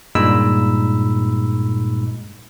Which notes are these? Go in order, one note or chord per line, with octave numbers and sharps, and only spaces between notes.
G2 A#2 G#3 D#4 B5 E6